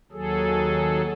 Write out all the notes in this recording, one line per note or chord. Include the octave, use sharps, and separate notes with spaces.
D#2 F#3 G#4 A4